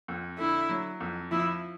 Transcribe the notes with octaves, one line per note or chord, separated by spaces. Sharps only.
F2
D3 E4
F#3
F2
F3 E4